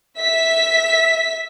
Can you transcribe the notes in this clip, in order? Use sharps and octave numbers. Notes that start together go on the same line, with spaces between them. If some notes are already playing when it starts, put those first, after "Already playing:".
E5 B6